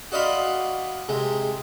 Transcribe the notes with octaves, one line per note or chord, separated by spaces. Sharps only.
F#4 D5 D#5 F5 B5 C6
C3 G#3